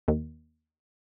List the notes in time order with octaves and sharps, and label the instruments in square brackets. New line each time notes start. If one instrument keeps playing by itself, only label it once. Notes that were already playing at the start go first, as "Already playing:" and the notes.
[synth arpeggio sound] D#2